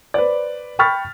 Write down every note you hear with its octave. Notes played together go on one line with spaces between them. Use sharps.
B4 C5 D5
G5 B5 C#6 F6 A6 B6